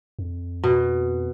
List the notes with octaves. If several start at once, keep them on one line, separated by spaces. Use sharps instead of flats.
F2
B2